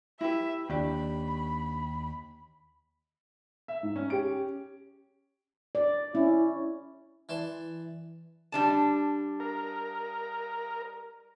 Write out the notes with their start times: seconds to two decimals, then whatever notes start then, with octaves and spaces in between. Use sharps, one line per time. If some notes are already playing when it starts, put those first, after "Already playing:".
0.21 E4 G4 B4 E5
0.70 D#2 D4 G4 B5
3.68 E5
3.83 G#2
3.96 C#4
4.10 G4 D7
5.75 D5
6.15 C#4 E4
7.29 E3 D5 A5 C6
8.52 G3 D4 A5
9.40 A#4